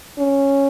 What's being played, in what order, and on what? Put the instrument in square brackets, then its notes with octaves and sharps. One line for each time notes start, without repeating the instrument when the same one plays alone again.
[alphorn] C#4